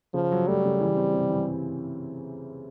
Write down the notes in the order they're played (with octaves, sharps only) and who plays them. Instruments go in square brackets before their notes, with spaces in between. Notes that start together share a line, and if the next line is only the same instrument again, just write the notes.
[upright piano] C#3 [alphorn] F3
[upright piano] F#3
[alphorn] G3 [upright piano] A3
[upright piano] C#3
E3
C4
C3
E3